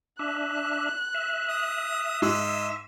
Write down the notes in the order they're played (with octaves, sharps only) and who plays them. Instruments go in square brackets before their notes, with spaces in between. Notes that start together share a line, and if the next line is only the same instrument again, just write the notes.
[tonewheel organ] D4 E5 [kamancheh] F#6
[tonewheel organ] E5
[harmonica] D#6
[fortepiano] G#2 [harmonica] D#5 E6